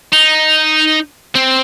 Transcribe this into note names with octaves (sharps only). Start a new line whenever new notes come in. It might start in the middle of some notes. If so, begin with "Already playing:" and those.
D#4
C4